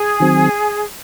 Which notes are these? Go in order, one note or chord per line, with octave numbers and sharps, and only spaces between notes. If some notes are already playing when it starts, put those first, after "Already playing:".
Already playing: G#4
D#3 F#3 C4